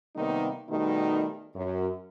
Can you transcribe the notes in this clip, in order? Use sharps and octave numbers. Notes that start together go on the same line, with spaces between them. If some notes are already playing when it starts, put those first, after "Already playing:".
C3 D#3 G3 A#3 B3 D#4
B2 D#3 G3 A3 D#4
F#2